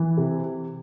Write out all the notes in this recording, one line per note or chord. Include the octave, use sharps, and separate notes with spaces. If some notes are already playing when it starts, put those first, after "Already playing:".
Already playing: E3
C3